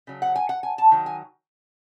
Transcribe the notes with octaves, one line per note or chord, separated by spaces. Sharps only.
C#3 F#3
F#5
G#5
F#5
G#5
A5
D#3 F#3
G#5